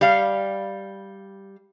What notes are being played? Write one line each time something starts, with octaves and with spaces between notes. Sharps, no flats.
G3 F5